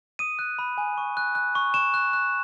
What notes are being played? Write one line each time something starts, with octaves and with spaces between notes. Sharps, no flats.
D#6 D#7
F#6
B5
G#5
C#6
F#6
F#6
C#6
C#6 E7
F#6
F#6